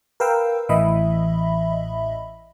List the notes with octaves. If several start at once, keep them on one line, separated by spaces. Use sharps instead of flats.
A#4 B4 F5 G5 E6
A1 A2 E3 D#5 E5 B5